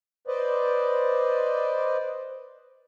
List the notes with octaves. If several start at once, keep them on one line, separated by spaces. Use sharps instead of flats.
B4 C5 D5 D#5